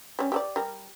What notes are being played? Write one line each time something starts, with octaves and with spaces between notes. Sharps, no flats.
G3 C#4
G4 A4 D5
G3 A#4